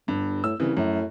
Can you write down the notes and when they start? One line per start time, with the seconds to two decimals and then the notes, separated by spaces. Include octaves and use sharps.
0.08 G1 G2
0.44 A2 E6
0.60 C2 C#3 E3
0.77 F#2 A2